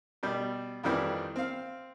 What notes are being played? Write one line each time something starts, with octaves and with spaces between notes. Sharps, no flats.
B2 G3
F2 D#3 E3 G3 C4
C4 F5